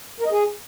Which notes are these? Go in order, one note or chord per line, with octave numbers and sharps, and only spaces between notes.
A#4
D#5
G#4